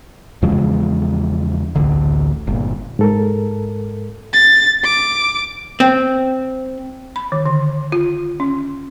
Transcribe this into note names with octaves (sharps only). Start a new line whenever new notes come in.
E2 C#3 F3 G#3
A1 D2 D3
G1 A#2
G#2 A4 A#4
A6
D6
C4
B5
D#3
D3
F4
C#4